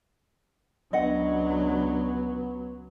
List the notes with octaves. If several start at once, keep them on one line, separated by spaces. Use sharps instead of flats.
C#2 F#3 B3 D4 D#5 F#5